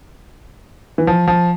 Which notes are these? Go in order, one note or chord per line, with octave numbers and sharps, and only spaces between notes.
E3
F3
F3